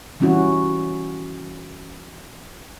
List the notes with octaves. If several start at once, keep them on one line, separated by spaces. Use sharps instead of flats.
E3 G3 C#4 E4 F#4